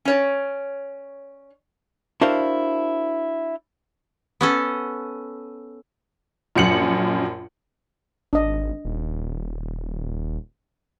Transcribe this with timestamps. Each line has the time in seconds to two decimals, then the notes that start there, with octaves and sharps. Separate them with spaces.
0.05 C#4 C#5 D5
2.21 D4 E4 F#4 A#4 C5 F5
4.41 B3 C#4 A4
6.55 A#1 F#2 C#7 F#7
8.33 G#1 D4 D#5
8.85 D#1